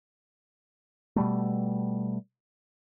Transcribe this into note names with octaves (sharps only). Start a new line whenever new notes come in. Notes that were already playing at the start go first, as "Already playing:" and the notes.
B2 G3 A3